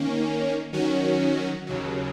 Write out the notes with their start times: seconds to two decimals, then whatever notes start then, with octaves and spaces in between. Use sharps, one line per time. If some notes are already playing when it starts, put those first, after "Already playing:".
Already playing: D#3 A#3 C#4
0.73 D#3 F#3 C#4 F#4
1.67 D#2 C#3 F#3